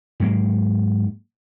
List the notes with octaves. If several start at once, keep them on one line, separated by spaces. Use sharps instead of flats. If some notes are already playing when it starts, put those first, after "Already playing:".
G#2 F#3 A#3